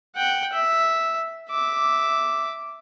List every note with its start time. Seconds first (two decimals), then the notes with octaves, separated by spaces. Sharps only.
0.16 F#5 G5
0.52 E5
1.50 E5 D6